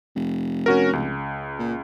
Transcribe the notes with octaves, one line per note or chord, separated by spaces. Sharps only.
F1
C#4 F#4 A#4
C#2
A#2